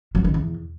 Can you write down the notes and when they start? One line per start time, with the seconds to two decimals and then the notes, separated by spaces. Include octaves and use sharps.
0.15 F#3
0.24 D#3
0.34 E2